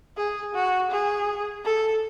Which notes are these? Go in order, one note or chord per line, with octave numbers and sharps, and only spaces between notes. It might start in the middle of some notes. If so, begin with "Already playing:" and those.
G#4
F#4
G#4
A4